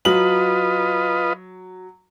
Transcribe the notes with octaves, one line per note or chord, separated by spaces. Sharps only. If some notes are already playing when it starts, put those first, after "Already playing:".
F#3 F4 B4 D#5 F#7